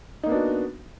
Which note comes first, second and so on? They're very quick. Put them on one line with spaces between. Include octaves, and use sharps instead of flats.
D#4 A#3 B3 D4 F#4